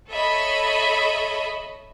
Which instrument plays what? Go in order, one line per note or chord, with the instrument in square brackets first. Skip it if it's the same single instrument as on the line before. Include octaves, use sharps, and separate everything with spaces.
[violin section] A4 C#5 D#5 E5 B5